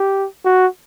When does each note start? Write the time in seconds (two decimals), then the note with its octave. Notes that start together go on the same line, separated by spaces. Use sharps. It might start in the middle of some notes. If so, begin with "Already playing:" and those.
Already playing: G4
0.45 F#4